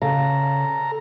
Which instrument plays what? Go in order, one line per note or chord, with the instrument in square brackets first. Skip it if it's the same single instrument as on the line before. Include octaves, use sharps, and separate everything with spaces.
[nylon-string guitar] C#3 F5 [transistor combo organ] A4 A#5